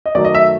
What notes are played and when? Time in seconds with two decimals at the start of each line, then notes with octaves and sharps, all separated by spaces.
0.06 D#5
0.15 F#2 D#3 F#3 A3 D5
0.25 D#5
0.35 E5